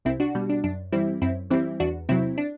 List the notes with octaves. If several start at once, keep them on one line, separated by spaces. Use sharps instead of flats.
C2 C4 E4
D4 F#4
B2 G3
D4
F#2 D4
E3 G3 C4 E4
F#2 C4 E4
E3 G3 C4 E4
E2 D4 F#4
C3 F#3 C4 E4
D4